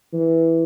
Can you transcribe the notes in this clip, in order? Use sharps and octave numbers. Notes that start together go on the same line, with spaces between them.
E3